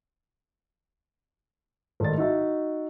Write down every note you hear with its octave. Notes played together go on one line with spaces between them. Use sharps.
G#1 A3 D5 D#5 A6
D#4 F#4 E5